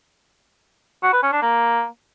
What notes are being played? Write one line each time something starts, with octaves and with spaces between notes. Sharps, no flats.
F#4
B4
C#4
D4
A#3